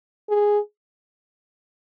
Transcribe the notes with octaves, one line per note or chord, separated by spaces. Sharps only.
G#4